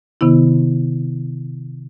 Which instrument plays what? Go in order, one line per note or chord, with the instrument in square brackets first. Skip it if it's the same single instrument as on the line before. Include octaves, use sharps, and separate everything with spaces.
[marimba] C3 D#3 B3 E4